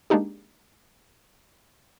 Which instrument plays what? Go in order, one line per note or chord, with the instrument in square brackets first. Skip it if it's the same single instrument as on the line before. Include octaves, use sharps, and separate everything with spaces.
[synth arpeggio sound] G#3 A#3 D4 D#4 G4